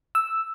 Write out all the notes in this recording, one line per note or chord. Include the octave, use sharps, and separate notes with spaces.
E6